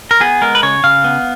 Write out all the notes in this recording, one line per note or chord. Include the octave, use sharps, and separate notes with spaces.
A#4
B3 G#4
G#3 A#4
B4
C#3 C#5
C#3 F5
B3